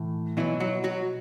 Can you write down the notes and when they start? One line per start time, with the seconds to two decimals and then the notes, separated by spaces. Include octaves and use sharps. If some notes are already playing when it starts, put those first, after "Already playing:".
Already playing: A2 E3
0.37 B2 E3 F#3 E4
0.60 F#3 F#4
0.84 F#3 F#4